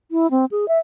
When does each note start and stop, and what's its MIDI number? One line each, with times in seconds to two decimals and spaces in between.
0.11 0.30 64
0.31 0.45 60
0.51 0.68 68
0.68 0.79 76